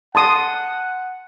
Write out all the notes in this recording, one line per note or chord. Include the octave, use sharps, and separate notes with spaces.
F#5 A5 C6 D#6